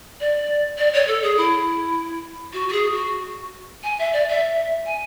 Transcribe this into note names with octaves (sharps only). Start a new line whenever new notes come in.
D5
D5
C#5
A4
G#4
E4
F#4
F#4
G#4
F#4
G#5
E5
D5
E5
G#5